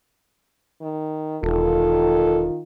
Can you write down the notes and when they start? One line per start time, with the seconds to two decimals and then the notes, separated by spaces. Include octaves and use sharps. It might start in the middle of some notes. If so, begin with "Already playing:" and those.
0.81 D#3
1.43 E1 D#3 F4 A4